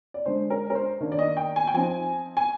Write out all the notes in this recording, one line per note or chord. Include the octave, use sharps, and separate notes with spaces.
D5
D3 G#3 D4 C5
A#4
A#4
C5
D#3 A#3 D4
D5
D#5
G5
G#5
G5
F3 C4 D#4 G#5
G#5